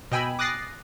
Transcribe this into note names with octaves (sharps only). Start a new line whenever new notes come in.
B2 D#5 G5 G#5 B5 E6
D6 D#6 F#6 A6 A#6 C7